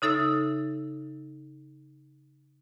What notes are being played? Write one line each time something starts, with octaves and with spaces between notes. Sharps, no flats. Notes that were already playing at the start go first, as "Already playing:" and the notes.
C#3 D#4 A4 E5 E6